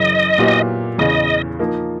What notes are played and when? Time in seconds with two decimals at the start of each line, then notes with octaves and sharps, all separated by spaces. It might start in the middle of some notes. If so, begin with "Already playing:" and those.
Already playing: F#2 C#3 E3 D#5
0.38 A#2 F#3 B3 E4 G4
0.98 E2 C#3 E3 D#5
1.59 F3 A#3 D#4